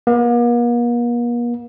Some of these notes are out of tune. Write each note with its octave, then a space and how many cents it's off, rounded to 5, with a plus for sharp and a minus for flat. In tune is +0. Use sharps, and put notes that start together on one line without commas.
A#3 +45